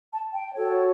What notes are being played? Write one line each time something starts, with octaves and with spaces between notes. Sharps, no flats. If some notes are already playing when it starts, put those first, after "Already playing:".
A5
G5
F#4 A4 C#5